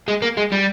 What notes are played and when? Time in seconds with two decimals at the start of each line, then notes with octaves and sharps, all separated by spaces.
0.08 G#3
0.22 A#3
0.37 G#3
0.52 G3